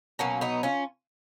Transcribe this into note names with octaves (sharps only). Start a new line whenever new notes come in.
B2 F#3 A#3 C#4
B3 D#4
C#4 F4